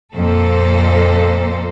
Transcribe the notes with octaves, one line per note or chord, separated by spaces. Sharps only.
F2 A#2 A#3 A4 C5